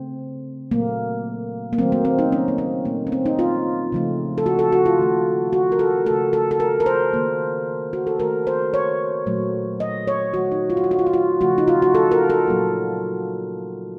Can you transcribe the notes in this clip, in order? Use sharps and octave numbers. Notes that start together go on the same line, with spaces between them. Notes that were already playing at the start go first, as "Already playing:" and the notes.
Already playing: C#3 A3 C4
A#2 F#3 A3 A#3
A#3
D#3 F#3 A3 C4
A#3
C4
D#4
C#4
A#3
C4
A#2 A3 A#3
C#4
C4
D#4
F4
C#3 F3 A3
A4
F#4
A4
F#4
F4
D#3 A3
F#4
A#4
A4
C#3 A3 A4
A4
A4
A#4
A#4
C5
D#3 A#3
F#4
A4
D#3 A3 A#4
C5
C#5
A#2 F#3 A3
D#5
C#5
D#3 F#3 A3 F#4
D#4
F4
F#4
F4
F#4
F4
F#4
F4
C#3 F3 A3 F#4
D#4
F4
F#4
A4
A#4
A4
A#2 F#3 A#3